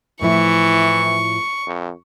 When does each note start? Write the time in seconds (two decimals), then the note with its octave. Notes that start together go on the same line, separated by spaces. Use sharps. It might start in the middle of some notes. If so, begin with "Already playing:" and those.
0.21 A2 E3 F3 E4 C#6
1.67 F2